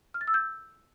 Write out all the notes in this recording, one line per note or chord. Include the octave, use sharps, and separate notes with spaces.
F6
A6
E6
G6